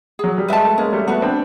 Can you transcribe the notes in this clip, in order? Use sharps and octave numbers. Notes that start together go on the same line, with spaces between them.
F#3 G#4
G3
G#3 B4 E5 A5
A3
G#3 A#3 C#4
G3 A3
A3 B3 F#4 B4
C4 D4